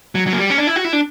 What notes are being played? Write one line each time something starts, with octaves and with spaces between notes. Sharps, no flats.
F#3
F#3
A#3
G3
C#4
D4
E4
F#4
E4
D4